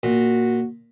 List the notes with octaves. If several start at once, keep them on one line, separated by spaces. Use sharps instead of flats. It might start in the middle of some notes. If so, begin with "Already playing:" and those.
A#2 F#4